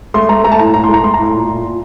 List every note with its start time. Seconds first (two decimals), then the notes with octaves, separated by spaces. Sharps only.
0.14 A3 C6
0.29 A3 A#5
0.44 A3 A#5
0.52 A5
0.59 A2 A#5
0.74 A2 A#5
0.84 C6
0.89 A3 A#5
1.04 A3 C6
1.14 A#5
1.18 A2
1.24 C6
1.34 A#2
1.49 A#2
1.64 A#2